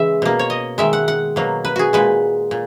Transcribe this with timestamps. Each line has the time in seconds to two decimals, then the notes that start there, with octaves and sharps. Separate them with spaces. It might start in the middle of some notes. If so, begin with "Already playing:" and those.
Already playing: C#3 E3 G#3 E5
0.22 B2 A#3
0.39 C#5
0.50 D#5
0.78 D#3 G#3 E5
0.93 F#5
1.08 F#5
1.36 B2 F#3 A#3
1.65 B4
1.76 F#4 G#4
1.93 A#2 G#3 B4
2.51 A#2